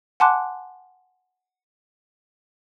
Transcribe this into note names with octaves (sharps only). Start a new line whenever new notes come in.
F#5 G#5 A5 C6 D6 F#6